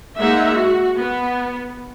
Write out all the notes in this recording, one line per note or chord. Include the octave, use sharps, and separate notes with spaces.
G#3 A#3 D#4 E5 F#5
F#4
B3